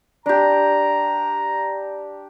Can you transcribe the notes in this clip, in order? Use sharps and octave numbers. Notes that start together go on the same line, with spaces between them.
D4 G4 A#5